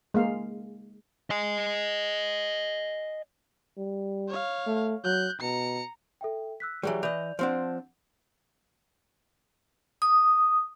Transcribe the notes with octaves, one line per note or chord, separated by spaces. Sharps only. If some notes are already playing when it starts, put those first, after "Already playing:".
G#3 A#3 F5
D#5 G#5
G3
C#5 F5
A3
F#3 F#6 G6
B2 A#5 C#7
A4 E5 G5
E6 F#6 B6
E3 F#3 G3 G#4
E3 D5 D#5 G6 F7
F3 C4 D4 F#5 G6
D#6